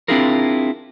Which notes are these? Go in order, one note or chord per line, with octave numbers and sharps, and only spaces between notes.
C4 D4 E4 F4 G#4 A#4